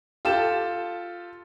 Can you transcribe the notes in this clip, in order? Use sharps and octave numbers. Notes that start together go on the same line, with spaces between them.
F4 G4 A4 E7